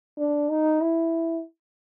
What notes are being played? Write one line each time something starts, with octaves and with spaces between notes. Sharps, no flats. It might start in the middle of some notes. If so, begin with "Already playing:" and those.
D4
D#4
E4